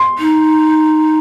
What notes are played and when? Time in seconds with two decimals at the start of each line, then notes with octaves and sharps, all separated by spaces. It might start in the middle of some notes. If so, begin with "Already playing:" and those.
Already playing: C6
0.18 D#4